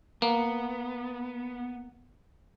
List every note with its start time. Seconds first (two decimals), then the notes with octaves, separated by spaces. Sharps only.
0.22 A#3 B3